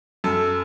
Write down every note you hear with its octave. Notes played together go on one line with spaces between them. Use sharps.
F#2 A4